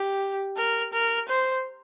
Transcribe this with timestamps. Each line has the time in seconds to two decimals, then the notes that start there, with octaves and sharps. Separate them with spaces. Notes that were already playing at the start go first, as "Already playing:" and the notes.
Already playing: G4
0.57 A#4
0.93 A#4
1.29 C5